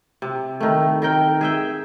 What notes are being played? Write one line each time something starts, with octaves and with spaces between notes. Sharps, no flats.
C3
D#3 A3
D#3 A#4 G5
G#4 E5 G5